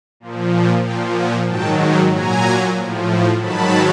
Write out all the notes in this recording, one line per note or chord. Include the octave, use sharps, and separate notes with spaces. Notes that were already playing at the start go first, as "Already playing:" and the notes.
A#2 F3
A#2 F3 F5 G5
F#5 G#5
G#2 D#3 F#3 G5 A5
A#2 F#3 G#5 A#5
A2 F3
G#2 D#3 F#3 A5 B5